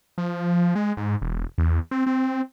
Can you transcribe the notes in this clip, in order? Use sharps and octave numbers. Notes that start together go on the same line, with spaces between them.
F3
G#3
G#2
E1
E2
C4
C4